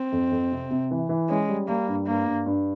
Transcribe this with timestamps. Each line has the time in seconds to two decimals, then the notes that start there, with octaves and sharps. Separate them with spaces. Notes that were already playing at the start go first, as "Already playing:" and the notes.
Already playing: C4
0.12 F2
0.31 F2
0.51 C3
0.70 C3
0.91 E3
1.09 E3
1.29 G#3 C#4
1.49 G3
1.68 G3 A#3
1.88 G2
2.07 G2 A#3
2.26 G2
2.46 G2